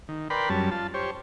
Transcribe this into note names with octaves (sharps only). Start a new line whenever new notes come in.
D#3
A#4 B4 D5 G5 B5 C6
F#2 G3 C#4 A5
F4 A5
G4 C5 C#5